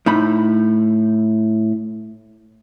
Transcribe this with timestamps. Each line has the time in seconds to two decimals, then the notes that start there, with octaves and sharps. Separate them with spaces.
0.06 A2 D#4 B5